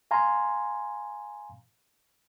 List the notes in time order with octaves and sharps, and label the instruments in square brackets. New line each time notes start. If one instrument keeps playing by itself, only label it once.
[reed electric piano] F5 G#5 A#5 C6